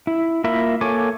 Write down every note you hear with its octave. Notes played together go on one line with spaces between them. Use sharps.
E4
A#3 F4 A#4 E5 B5
A#3 A4 C#5 G#5 D6